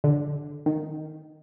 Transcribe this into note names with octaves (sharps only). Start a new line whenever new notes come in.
D3
D#3